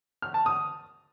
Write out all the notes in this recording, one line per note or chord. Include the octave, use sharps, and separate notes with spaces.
F6
A5
D#6